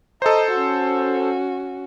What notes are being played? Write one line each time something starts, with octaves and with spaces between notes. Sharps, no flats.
A4 C5 D#5 A#5
C#4 F#4